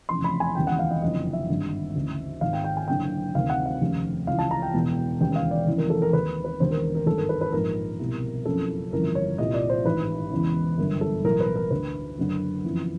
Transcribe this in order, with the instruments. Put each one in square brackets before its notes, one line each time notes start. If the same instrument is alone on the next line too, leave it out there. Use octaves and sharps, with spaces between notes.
[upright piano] F1 E2 C#3 C6
B5
G#5
E1 D#2 C#3 E3 G5
F#5
F5
D#5
F#1 F2 D3 D#5
E5
G#1 G2 D3
D2 C#3 E3
G#1 G#2 D#3 F5
G5
G5
G#5
F#1 F#2 D3 G5
D2 C3 D#3 F5
F#5
F5
F1 D#2 C#3
C#2 C#3 E3 F5
A5
A#5
G5
E1 E2 B2
E1 D#2 C#3 G5
F5
D5
F1 D#2 C#3 E3
A#4
A4
A#4
D#2 D#3 B4
B4
E1 D#2 D3 C5
A#4
A#4
G#1 G2 D#3 A4
A#4
B4
B4
A#1 G#2 D#3 A#4
C2 B2
F#1 F2 C#3 A4
G1 F2 C#3 E3 A#4
C#5
C2 A#2 D#5
D5
C5
A1 G#2 D#3 B4
E1 E2 C#3
G1 F#2 D3 A#4
A4
B1 A2 E3 A#4
B4
A#4
D2 D3 B4
F#1 F#2 D3
F#1 F2 C#3 E3